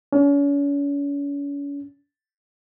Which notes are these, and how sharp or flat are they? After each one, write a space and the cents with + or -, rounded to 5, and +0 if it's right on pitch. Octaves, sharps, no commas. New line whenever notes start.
C#4 +40